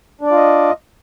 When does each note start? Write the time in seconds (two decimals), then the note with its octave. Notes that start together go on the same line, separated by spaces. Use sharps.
0.21 D4
0.26 D5
0.31 F4
0.36 D#5